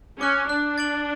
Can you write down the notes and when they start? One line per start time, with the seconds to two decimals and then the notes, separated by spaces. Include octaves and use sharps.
0.21 C#4 D6 F#6
0.49 D4 F#6
0.78 A6 D7 F#7